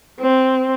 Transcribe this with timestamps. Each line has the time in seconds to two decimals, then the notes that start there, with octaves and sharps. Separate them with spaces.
0.20 C4